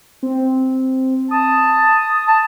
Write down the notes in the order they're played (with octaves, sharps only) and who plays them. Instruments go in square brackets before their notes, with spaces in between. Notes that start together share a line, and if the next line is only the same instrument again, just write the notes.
[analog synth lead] C4
[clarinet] A5 [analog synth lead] D#6
[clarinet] A5